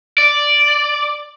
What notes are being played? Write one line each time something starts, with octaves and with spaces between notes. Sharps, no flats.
D5